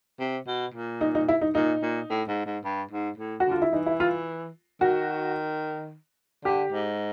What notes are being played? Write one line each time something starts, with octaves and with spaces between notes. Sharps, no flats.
C3
B2
A#2
D#4
D#4
E4
D#4
A#2 D#4
A#2
A2
G#2
G#2
G2
G#2
A2
F#4
D3
F4
E4
E3 D#4
E4
F4
D#3 F#4
D3 G4
G#2